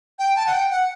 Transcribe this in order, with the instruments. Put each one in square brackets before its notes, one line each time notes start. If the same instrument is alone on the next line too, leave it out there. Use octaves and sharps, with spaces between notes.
[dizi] G5
A5
F#5
G5
F#5